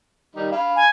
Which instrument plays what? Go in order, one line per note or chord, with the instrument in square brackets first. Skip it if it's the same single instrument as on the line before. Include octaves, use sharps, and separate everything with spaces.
[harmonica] D#3 G3 D#4
F5 B5
[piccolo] G#5